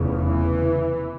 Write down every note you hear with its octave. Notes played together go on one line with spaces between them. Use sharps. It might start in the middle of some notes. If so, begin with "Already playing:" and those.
Already playing: F1 E2 C#3
E3